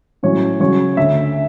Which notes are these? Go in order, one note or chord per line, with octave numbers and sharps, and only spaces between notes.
A2 F#3 C#4 C#5
C#3 F#3 C#4 C#5
D2 D3 A3 E5